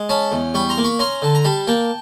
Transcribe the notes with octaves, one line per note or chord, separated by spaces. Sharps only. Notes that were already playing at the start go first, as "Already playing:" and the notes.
Already playing: G#3
C#4 A5 B5
E2
G3 B5 C#6
A#5 C6
A#3
B5 C#6
C#4 A#5 C6
D3 A5
A#5
G3 A5 B5
A#3 G5 A5